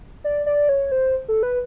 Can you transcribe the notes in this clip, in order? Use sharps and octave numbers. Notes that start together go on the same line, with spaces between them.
D5
D5
C#5
C5
A4
B4